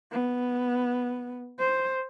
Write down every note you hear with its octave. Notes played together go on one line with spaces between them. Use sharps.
B3
C5